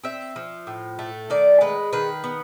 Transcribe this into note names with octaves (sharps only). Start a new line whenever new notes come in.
C4 E5
F3
A2
A3
D#3 D5
G#3 B4
D#3 B4
B3